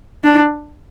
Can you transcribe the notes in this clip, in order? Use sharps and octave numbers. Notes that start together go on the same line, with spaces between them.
D4